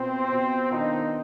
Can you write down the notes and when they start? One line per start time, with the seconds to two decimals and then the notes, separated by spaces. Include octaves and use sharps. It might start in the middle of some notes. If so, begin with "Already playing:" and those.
Already playing: B2 B3 C4 F4
0.31 B2 B3 F4
0.71 D#3 B3 D4 D#4 F4